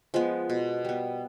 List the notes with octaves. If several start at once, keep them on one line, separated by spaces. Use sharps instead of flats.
F3 G#3 B3
B2
G3 B3